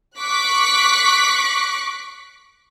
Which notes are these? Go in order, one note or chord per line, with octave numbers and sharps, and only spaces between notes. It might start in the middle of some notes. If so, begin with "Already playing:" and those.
C#6 D6 F#6 B6